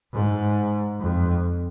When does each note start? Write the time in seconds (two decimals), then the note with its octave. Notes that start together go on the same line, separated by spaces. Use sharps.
0.12 G#2
1.00 F2